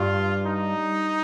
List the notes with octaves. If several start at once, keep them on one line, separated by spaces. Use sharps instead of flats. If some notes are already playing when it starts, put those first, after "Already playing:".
Already playing: G2 F4
D#4